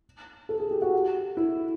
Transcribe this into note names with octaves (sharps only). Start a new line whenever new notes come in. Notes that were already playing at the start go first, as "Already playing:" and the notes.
A4
G#4
G4
F#4
E4